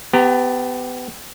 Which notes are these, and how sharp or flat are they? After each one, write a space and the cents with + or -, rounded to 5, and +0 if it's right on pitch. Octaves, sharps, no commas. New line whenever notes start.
B3 +25 G4 +0 A#5 -25